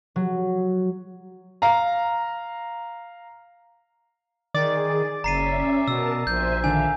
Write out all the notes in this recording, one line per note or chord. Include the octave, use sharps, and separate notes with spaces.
F#3
F5 A#5
D#3 G#4 D5 D6 A6
F#1 C#4 E5 A#5 C7 D#7
B2 A#4 A5 E6
A#1 C5 E5 G#5 G6
D3 D#3 D4 E5 F5 G#5